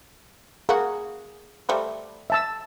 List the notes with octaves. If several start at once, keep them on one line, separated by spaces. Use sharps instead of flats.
A#3 F#4 G#4
G3 A3 C5
E5 A5 E6